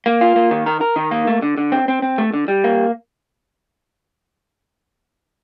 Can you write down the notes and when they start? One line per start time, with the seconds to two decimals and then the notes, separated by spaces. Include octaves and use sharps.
0.06 A#3
0.21 F4
0.36 A#3
0.51 D#3
0.66 A#4
0.81 A#4
0.96 D#3
1.11 A#3
1.27 A3
1.42 D3
1.58 D3
1.72 C4
1.88 C4
2.02 C4
2.18 A3
2.34 D3
2.48 G3
2.64 A#3